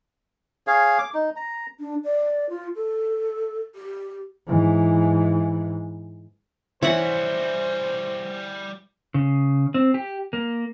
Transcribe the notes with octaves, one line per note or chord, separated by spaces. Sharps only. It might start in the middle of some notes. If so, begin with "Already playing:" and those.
G#4 C#5 F5
D6
D#4
A#5
D4
D5
F4
A4
G4
G#2 E3
E3 G3 F#4 C5 C#5 E5 F#5
C#3
C4
G4
A#3